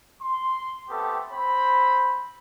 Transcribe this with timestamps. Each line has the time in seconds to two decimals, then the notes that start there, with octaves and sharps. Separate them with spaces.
0.21 C6
0.89 A3 B3 C4 G4 A4
1.32 C4 C5 B5